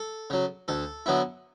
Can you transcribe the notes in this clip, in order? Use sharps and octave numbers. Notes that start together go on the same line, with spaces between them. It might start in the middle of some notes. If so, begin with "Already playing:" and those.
Already playing: A4
C#3 F#3
D2 A4
D3 F#3 B3 E4